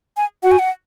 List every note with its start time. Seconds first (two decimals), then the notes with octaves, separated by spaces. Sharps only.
0.17 G#5
0.43 F#4 F#5
0.51 G#5
0.59 F#5